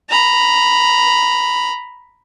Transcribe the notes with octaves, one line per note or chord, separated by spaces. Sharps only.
A#5 B5